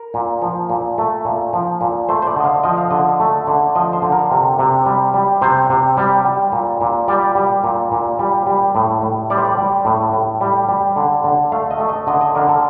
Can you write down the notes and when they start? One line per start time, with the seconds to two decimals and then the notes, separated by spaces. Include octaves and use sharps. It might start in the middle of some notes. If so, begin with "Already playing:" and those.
Already playing: A#4
0.14 A#2
0.42 F3
0.70 A#2
0.98 A3
1.25 A#2
1.53 F3
1.81 A#2
2.09 A3 C5
2.22 C5
2.27 D5
2.36 D3 D#5
2.45 F5
2.63 F3 D#5
2.78 F5
2.91 D3 D#5
3.20 A3
3.47 D3
3.75 F3 D#5
3.93 C5
4.02 D3
4.12 A#4
4.31 C3
4.59 C3
4.86 G3
5.14 G3
5.42 C3 C5
5.70 C3
5.97 G3
6.25 G3
6.52 A#2
6.81 A#2
7.08 G3 D5
7.35 G3
7.64 A#2
7.92 A#2
8.19 G3
8.47 G3
8.75 A2
9.02 A2
9.30 G3 D5
9.38 C5
9.45 D5
9.58 G3
9.85 A2
10.13 A2
10.41 G3
10.69 G3
10.96 D3
11.24 D3
11.52 A3 F5
11.71 D#5
11.80 A3
11.89 D#5
12.07 D3 D#5
12.21 D#5
12.35 D3 A#4
12.49 A4